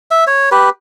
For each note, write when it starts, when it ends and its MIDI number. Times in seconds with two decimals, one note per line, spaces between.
0.11 0.24 76
0.27 0.49 73
0.52 0.69 67
0.52 0.69 71